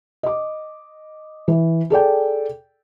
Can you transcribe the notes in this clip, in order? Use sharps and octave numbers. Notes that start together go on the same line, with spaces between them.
D#5 D6
E3
G#4 A4 D5 G5